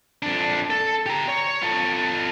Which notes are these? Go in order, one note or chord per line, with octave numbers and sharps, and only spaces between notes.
F2 D4
A4
G4 A#5
C#5
F4 A4